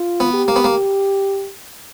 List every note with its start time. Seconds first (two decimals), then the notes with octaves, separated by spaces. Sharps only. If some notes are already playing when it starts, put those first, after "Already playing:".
Already playing: F4
0.20 B3
0.34 G4
0.48 A#3
0.56 B3
0.64 A#3